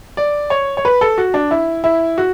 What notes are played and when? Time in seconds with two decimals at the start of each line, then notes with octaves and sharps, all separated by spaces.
0.17 D5
0.50 C#5
0.77 C#5
0.85 B4
1.01 A4
1.18 F#4
1.34 D4
1.51 E4
1.84 E4
2.18 F#4